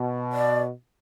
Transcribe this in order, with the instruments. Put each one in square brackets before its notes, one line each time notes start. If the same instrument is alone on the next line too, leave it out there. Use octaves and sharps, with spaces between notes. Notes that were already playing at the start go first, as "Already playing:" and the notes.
Already playing: [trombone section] B2
[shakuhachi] D5